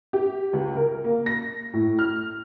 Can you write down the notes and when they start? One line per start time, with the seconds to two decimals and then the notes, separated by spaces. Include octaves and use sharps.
0.13 G4
0.53 C#2
0.76 A#4
1.04 A#3
1.26 A#6
1.73 A2
1.99 F6